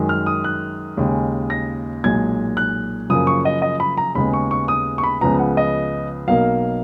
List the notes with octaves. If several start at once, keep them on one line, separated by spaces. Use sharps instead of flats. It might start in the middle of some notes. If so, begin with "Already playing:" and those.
Already playing: F#2 D#3 G#3
F6
D#6
F#6
D#2 C#3 G#3
A#6
B1 A#2 G#3 G#6
F#6
F#2 C#3 F3 A#3 D#6
C#6
D#5
D#5
B5
A#5
D#2 C#3 G#3 B3 B5
C#6
C#6
D#6
C#6
B5
C#2 C#3 F3 B3 A#5
F#5
D#5
B1 B2 A#3 F5